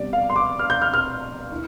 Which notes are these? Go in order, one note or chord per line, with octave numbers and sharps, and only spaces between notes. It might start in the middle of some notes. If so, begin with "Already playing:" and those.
Already playing: C3 G3 B3 D4 D5
F5
C6
D6
F6
G6
F6
F6
E4